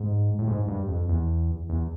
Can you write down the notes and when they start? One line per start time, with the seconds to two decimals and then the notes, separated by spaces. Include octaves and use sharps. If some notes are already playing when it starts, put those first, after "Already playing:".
Already playing: G#2
0.39 A2
0.47 G#2
0.68 G2
0.88 F2
1.09 E2
1.69 E2